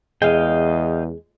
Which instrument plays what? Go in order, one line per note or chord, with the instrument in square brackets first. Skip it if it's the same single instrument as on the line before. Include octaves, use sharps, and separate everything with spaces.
[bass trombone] E2 [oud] G#3 [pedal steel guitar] D#5 F5 G5